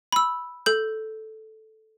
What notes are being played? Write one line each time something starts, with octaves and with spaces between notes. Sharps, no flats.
B5 E6
A4 G6